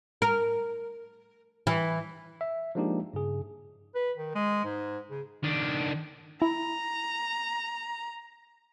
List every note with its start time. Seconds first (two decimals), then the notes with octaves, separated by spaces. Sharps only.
0.22 A#4
1.67 E3
2.41 E5
2.75 F3 G#3 A#3 D4 D#4 G4
3.13 G2 C#3 G#4
3.95 B4
4.16 D#3
4.35 G#3
4.64 G#2
5.10 C#3
5.44 D#3 D4
6.42 E4 A#5